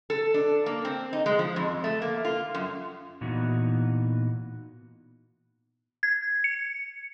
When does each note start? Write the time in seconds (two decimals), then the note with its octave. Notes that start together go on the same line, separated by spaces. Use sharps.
0.10 A4
0.34 D4
0.66 A#3
0.85 C4
1.13 D#4
1.26 G#3
1.39 F3
1.56 F2
1.84 A3
2.02 A#3
2.25 F4
2.55 F#2
3.21 A#2 E3 B3 D#4 F#4
6.03 G#6
6.44 C#7